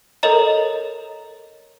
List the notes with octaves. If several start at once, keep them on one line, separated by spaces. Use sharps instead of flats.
A4 A#4 C#5 D#5 A#5